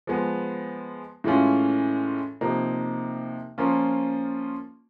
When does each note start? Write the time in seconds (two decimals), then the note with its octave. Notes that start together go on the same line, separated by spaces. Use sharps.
0.07 F3 G#3 B3
1.24 A2 E3 G#3 C#4 F4
2.41 C3 F3 A#3 D#4
3.58 F3 A#3 C#4 F4